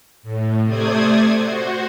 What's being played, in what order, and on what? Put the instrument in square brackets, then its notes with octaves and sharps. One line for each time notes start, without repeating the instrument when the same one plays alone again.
[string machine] A2
C3 A3 C5 D5 D#6 G#6
F#4 C5